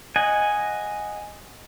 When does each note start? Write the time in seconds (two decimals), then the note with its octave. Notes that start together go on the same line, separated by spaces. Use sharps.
0.16 D#5 F#5 G#5